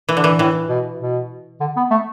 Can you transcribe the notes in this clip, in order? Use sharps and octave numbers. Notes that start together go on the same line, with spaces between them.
E3
D3
E3
A2 E3
B2
B2
D3
B3
A3